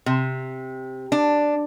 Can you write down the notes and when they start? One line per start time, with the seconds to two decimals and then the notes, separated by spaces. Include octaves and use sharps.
0.06 C3
1.12 D4